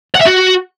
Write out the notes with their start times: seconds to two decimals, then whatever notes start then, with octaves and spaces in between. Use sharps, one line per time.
0.15 F#5
0.21 E5
0.26 F#4